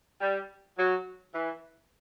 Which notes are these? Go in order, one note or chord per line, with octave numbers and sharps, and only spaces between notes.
G3
F#3
E3